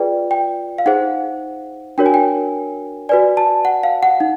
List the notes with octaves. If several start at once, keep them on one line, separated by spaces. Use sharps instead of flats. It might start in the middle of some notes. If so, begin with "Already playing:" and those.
Already playing: F4 G#4 B4 D5 G5
G5
F5
D#4 G#4 C5 F#5
D4 F#4 A#4 C#5 G5
G#5
G5
F#4 B4 D5 G#5
A5
F#5
F5
F#5
D#4